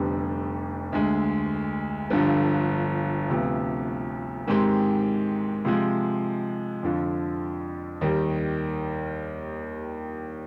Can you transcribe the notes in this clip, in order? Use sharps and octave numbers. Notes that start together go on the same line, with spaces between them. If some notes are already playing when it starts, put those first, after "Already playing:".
Already playing: F1 F2 D3 G3 B3
D2 D3 G#3
G1 G2 D3 F3
D2 C3 F3 B3
G#2 D#3 G#3 C4 G4
C3 F3 G#3
F2 D3 F3
D#2 D#3 G3